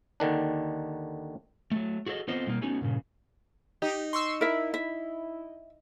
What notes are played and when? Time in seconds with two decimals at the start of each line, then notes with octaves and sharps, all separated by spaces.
0.20 D#2 D3 D#3 D4
1.71 F#3 A3
2.06 F#4 G#4 A4 C#5 D#5
2.28 B3 C4 F4 A4 C5 D#5
2.47 B2 G3 A#3 D#4 F4 A#4
2.62 A3 B3 C#4 D#4 F#4
2.81 G2 A#2 C#3
3.82 D#4 G4
4.13 C6 C#6 E6
4.41 E4 A#4 E5
4.74 E5